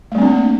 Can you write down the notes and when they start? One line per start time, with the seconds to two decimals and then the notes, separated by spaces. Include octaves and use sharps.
0.12 A3
0.15 G3
0.18 C4
0.22 D4
0.25 A#3